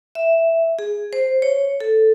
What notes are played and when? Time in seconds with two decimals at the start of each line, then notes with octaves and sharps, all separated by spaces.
0.15 E5
0.79 G#4
1.13 C5
1.42 C#5
1.81 A4